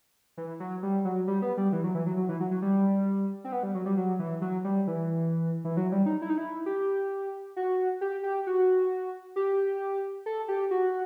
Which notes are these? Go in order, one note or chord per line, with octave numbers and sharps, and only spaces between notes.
E3
F#3
G3
F#3
G3
B3
G3
E3
F#3
E3
F#3
F#3
E3
F#3
F#3
G3
C4
B3
G3
F#3
G3
F#3
E3
F#3
G3
E3
E3
F#3
G3
D#4
E4
D#4
E4
G4
F#4
G4
G4
F#4
G4
A4
G4
F#4